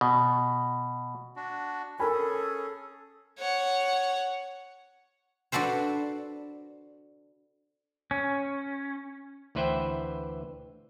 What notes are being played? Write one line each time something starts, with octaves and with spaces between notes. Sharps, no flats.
B2
D4 F#4
D#3 C#4 D4 A4 A#4 G#5 B5
C#4 G#4
C#5 F#5
D4 F#4 A4 B4 C5
C#4
D2 E3 B4 C5 E5 G5